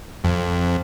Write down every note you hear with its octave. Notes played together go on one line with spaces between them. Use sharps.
F2